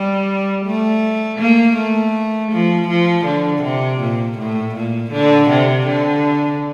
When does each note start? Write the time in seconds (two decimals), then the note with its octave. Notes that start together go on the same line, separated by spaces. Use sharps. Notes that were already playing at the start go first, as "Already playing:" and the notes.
Already playing: G3
0.66 A3
1.40 A#3
1.77 A3
2.52 F3
2.88 F3
3.25 D3
3.63 C3
4.00 A#2
4.38 A2
4.75 A#2
5.12 D3
5.50 C3
5.87 D3